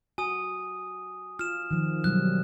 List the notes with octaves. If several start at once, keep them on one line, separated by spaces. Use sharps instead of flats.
F#4 G#5 D#6
F4 F6 E7
D#3 F3
B2 F#3 G3 F#6